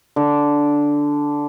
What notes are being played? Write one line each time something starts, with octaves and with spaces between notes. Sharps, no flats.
D3